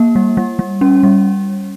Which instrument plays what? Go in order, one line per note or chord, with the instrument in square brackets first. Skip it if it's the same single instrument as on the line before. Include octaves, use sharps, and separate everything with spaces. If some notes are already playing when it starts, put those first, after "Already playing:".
Already playing: [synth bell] A#3
G3
G3
G3
C#4
G3